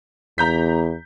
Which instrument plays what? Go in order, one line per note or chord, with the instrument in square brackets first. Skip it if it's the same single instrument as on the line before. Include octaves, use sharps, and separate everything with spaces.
[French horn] E2 [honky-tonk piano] A#5 G6 B6